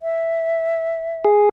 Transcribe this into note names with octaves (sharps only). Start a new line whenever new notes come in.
E5
G#4